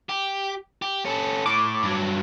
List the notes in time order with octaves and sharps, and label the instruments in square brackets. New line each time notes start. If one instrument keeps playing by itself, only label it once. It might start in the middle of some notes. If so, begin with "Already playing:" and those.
[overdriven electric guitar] G4
G4
C#4 A4
[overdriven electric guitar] A2 [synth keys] D6
[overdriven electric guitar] G2 F#3